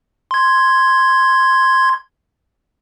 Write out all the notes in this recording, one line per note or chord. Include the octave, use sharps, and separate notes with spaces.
C6 G#6